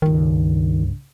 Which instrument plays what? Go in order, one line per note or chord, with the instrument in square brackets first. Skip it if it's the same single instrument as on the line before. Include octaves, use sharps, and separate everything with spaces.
[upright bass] C#2 G2 [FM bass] D#3